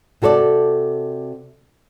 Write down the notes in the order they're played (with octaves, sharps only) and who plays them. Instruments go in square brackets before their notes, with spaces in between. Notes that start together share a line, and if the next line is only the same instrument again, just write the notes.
[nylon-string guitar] C3 F#4 A4 C#5 D5